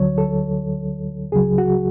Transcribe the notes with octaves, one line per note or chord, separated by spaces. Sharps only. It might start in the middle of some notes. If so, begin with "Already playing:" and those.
Already playing: D2 D3 F#3 C#5
A4
C#2 C#3 F#3 G#4
F#4